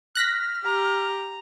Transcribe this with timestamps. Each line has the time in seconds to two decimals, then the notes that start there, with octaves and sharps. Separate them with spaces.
0.15 F6 F#6 A#6 B6
0.65 G4 A#5